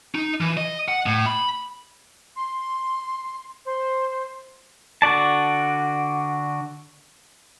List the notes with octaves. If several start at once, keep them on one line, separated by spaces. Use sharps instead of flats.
D#4
E3
D#5
F#5
A2
B5
C6
C5
D3 F#4 D5 A5